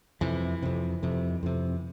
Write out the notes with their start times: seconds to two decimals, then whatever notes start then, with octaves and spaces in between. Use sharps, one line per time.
0.21 F2 C3 E3
0.62 F2 C3
1.03 F2 C3
1.43 F2 C3